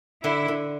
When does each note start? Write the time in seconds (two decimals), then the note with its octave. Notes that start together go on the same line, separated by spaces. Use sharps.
0.24 D3 E4
0.48 D3